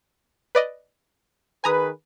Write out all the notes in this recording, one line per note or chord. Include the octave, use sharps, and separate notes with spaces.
B4 D5 D#5
D#3 G#4 B4 G#5 A#5 D#6